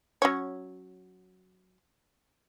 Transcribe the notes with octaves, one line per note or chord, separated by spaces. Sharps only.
F#3 C#4 C#5